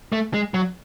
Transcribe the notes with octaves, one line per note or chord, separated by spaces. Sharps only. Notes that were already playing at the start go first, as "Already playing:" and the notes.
A3
G#3
F#3